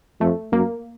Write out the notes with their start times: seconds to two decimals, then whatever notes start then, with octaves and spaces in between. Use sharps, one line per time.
0.20 F2 A3
0.52 F#2 A#3